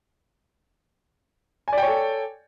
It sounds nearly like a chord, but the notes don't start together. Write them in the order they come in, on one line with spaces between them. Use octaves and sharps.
G#5 D5 G5 C#5 A4